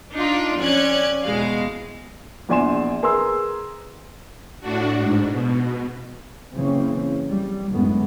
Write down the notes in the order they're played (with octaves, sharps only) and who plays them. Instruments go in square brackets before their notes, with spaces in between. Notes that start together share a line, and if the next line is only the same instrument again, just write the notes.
[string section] D4 D#4 F4
F2 C#4 D5 F#6 G#6
E2 B2 G#3 F5
[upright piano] A#1 E2 D5 G#5 C6 E7
G#4 A#4 B4 C6 E6
[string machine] A2 D4 F#4
G#2
B2
[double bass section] F#1 C#3 E3 C4 C#4
G3
A1 F#2 A2 D3 G#3 B3